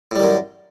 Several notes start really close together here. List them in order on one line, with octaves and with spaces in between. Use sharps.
A2 G3 D#3 F#2